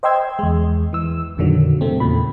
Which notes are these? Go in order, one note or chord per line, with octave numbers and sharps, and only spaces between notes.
C5 D#5 G5 C6 E6 G#6
E2 G#3
E3 E6
F2 A#2 D3 D#3 F#3
C3 A3 C4
E2 A#2 C#3 B5